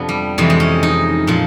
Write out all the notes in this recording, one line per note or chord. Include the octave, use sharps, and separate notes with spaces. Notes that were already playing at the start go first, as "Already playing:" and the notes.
Already playing: F2 C3 F3 B3 D4
G3
F2 C3 E3 G#3
G#3
C#4
D#4
A#2 F3